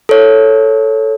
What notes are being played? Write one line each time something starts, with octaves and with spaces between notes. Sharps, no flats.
A4 C#5